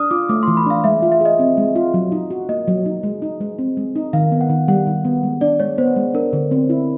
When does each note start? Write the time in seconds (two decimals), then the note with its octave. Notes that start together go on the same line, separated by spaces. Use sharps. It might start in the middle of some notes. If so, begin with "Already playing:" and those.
Already playing: D4 D#6 F6
0.11 F4 D6
0.29 A3 D6
0.43 E3 C6
0.57 B5
0.66 D4 F5
0.84 G#3 E5
1.02 F4
1.12 E5
1.20 G#4 D#5
1.39 C4
1.57 G#3
1.76 F4
1.94 F#3
2.12 D#4
2.30 F#4
2.49 A#3 D#5
2.68 F#3
2.86 D#4
3.03 G#3
3.22 D#4
3.41 G#3
3.59 C4
3.77 G#3
3.96 D#4
4.13 D#3 F5
4.32 B3
4.41 F#5
4.49 D#3
4.68 G3 F#5
4.87 D#3
5.05 B3
5.23 G#3
5.41 D4 D5
5.60 G#3 C#5
5.78 B3 C5
5.96 G#3
6.14 D4 A#4
6.33 D3
6.51 C4
6.69 E4